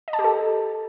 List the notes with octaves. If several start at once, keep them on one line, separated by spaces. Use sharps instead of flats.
D#5
A5
G4
A4